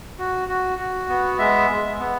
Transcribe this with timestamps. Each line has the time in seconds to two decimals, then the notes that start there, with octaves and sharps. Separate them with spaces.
0.19 F#4
0.48 F#4
0.78 F#4
1.09 B3
1.39 G#3 E5
1.70 G#3
1.99 B3